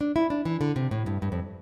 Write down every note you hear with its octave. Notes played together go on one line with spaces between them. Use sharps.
D4
E4
D4
E3
D3
C3
A2
G2
G2
F2